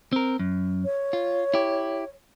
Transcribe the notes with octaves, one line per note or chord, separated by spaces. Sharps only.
C4 A#4
F#2
C#5
F4
E4 G4